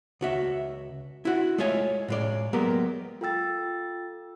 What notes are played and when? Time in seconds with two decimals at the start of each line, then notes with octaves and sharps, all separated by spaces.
0.21 C#2 F#4 E5
1.25 E4 F#4
1.58 G#3 A3 F4 C#5 E5 G#5
2.08 A2 G#3 D5
2.53 F#3 G#3 A#3 B3 G4 A#4
3.21 F4 A4 G5 E6 A6